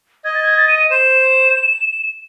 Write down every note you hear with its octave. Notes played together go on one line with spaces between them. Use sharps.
D#5 G#6
A6
G#6
A6
D#7
D#7
C5 E7